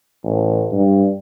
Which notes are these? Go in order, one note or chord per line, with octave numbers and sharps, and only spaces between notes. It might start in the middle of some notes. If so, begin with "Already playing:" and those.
A1
G2